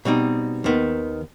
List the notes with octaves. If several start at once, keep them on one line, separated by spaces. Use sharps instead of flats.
B2 G3 C4 D#4
D#2 D#3 B3